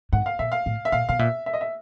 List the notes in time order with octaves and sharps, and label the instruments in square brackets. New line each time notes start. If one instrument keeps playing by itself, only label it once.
[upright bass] G#2 [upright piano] F#5
[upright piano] F5
[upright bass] A#2 [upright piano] E5
[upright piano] F5
[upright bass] A2
[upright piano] E5
[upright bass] A#2 [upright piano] F5
[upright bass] B2 [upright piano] F5
[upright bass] A#2 [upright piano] E5
[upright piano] E5
D#5
E5